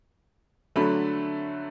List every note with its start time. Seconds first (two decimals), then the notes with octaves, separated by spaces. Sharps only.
0.76 D3 F#3 A3 B5